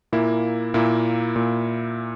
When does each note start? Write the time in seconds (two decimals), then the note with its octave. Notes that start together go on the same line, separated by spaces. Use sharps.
0.12 A#2 A#3 E4
0.74 A#2 A#3 E4
1.36 A#2